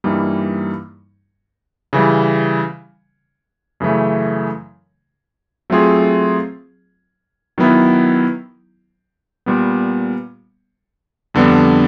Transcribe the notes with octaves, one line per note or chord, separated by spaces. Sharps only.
G2 E3 G3 A#3 D#4
C#3 E3 G3
F#2 C#3 E3 A3
F#3 A3 C4 F4 G#4
D#3 F#3 B3 E4
A#2 G3 B3
F2 D3 G3 B3 D4